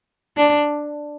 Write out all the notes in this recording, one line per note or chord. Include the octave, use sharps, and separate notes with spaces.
D4